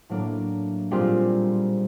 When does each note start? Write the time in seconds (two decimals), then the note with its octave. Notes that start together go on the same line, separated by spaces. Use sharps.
0.09 A2 F#3 A#3 D4
0.91 A#2 G3 C4 F4 G#4